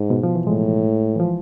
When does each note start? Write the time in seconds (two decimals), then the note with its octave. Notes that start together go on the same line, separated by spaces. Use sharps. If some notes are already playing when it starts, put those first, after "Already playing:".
Already playing: G#2
0.10 B2
0.23 F3
0.35 E3
0.47 A2 G#3
1.16 E3
1.20 F3